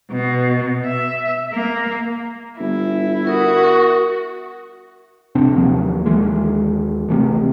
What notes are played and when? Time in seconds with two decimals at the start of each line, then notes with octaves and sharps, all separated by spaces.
0.11 B2
0.86 E5
1.52 A#3
2.60 G1 E4
3.27 F#4 A#4 D#6
5.35 F1 C3 C4 D4
5.56 D#2 F3 F#3 A#3
6.06 D#2 E3 G#3
7.09 A1 A2 C3